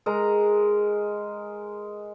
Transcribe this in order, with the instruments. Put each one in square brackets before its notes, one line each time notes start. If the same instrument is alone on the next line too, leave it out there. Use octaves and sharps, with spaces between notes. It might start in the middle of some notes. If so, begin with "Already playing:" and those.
[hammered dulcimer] G#3 A#4 A#5